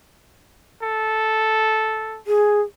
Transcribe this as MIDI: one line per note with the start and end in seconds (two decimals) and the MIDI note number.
0.83 2.20 69
2.27 2.61 68